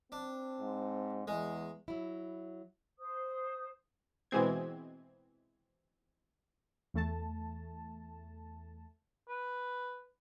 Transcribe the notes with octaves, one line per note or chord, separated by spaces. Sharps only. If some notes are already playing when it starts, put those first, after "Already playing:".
C4 D4
G#2
E2 G#3
F#3 E4
C5 D#6
B2 E3 G#3 C4 G#6
E2 A3 A5
B4